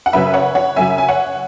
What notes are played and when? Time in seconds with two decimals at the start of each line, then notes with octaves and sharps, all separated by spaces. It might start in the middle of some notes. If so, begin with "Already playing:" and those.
0.06 F#5
0.13 F#2 C#3 F#3 B4 E5
0.34 C#5 F#5
0.55 C#5 F#5
0.76 F#2 C#3 F#3 E5 G#5
0.98 G#5
1.09 C#5 F#5